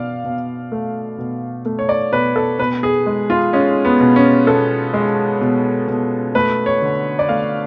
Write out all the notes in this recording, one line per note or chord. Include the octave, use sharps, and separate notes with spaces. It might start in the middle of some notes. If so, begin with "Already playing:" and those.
Already playing: B2 D5 F5
B2
A3
B2
A3
C#5
D5
B2 B4
A4
B2 B4
G#4
G#3
F4
G#3 C#4
B3
B2
C#4
B2 A4
G#3
B2
B2
A3 B4
C#5
D3
D5
A3 F5